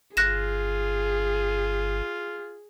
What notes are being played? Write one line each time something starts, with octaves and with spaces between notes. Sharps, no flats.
G1 F4 G#4 F#6 A#6 E7